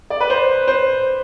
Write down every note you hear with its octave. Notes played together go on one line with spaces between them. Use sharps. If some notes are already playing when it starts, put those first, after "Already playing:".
D5
B4
C5
C5